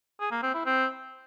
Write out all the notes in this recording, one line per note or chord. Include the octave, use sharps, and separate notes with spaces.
G#4
A#3
C4
E4
C4